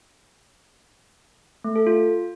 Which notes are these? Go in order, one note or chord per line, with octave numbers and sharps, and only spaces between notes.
A3
A4
F4